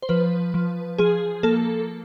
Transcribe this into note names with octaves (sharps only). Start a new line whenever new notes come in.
C5
F3 B4
F3
F3 G#4
A#3 A4